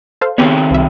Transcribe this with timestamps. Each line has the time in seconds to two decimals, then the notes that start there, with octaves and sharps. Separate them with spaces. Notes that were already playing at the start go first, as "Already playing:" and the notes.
0.21 A4 C5 F5
0.38 D#3 B3 C4 G4 C#5
0.71 C2 E5